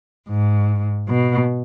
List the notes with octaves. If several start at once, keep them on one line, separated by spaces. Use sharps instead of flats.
G#2
B2